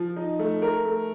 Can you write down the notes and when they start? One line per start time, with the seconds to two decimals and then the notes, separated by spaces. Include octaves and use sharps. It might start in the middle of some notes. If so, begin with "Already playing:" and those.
Already playing: F3
0.16 D#4
0.39 A3
0.62 A#4
0.85 A3